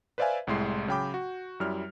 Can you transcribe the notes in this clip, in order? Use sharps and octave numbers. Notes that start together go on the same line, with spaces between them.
B4 C5 D5 E5 F5 G#5
C2 A2 G#3 C6 C7
C#3 F#3 G5 B5 D6 G6
F#4
F#2 G3 E4 F6